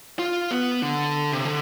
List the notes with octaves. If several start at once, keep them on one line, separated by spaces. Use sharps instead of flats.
F4
B3
D3
C3
D3